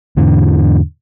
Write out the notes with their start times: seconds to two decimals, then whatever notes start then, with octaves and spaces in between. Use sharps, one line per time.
0.17 E2 G#2 D3 D4